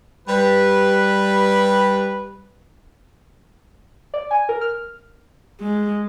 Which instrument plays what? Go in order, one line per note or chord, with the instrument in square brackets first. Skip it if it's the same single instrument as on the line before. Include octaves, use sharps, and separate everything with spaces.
[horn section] G3 B4
[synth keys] D5
G#5
A#4
F6
[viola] G#3